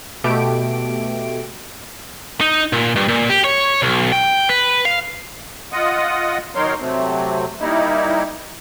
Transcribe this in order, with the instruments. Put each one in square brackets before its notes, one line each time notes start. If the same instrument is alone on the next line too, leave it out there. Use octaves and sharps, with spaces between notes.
[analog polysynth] B2 A3 G4 D7
[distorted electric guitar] D#4
A#2
G2
A#2
G4
C#5
B1
G5
B4
F5
[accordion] F4 D#5 F#5 D#6
D#3 F#3 D#4 A#4 C#5 C6
C3 F#3 A3 C4
G3 A#3 D#4 E4